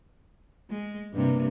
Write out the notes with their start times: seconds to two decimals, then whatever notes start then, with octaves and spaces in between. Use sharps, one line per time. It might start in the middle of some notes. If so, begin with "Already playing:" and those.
0.70 G#3
1.14 G2 C3 A#3